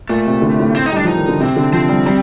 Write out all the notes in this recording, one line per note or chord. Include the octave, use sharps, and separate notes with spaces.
A#2 A3
C3
D3
A2
C4
D#4
G3 D4
F3 D#4
D#3
D3
C3 C4
D3
F3 C4
G3
G3